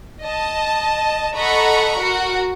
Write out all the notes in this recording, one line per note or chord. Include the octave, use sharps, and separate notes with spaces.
D#5 A5
A4 D#5 F#5 A#5 B5 C#6
F#4 A#4 F#5